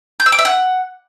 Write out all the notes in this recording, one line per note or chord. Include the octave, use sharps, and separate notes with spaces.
G6
E6
D6
E5
F#5